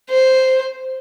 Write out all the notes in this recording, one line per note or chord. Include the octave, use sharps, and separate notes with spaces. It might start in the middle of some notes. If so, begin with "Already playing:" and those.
C5